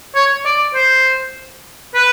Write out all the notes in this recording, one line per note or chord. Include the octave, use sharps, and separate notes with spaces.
C#5
D5
C5
B4